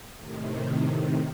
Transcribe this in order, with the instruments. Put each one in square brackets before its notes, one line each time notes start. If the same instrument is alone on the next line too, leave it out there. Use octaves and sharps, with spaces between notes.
[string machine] A2 C3 D#3